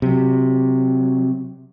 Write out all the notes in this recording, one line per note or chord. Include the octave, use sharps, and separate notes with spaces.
C3 F#3